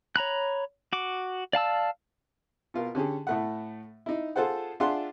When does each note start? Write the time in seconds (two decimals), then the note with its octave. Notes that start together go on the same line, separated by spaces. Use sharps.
0.16 C#5 A#5 B5 F#6
0.93 F#4 D6
1.53 D5 F5 A5 E6
2.74 B2 F4 A#4
2.95 D3 C#4 G4 G#4
3.27 A2 A3 F#5
4.06 D#4 E4
4.36 F4 G#4 A4 C5 F#5
4.80 D4 F4 G#4 E5 F#5 C6